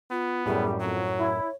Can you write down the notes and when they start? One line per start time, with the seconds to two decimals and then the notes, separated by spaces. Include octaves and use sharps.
0.11 B3 F4
0.46 F#2 A2 G3 G#4
0.80 F2 F#3 C#5
1.19 E4